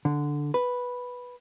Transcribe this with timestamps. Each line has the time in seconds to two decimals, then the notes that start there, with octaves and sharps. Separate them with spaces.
0.05 D3
0.54 B4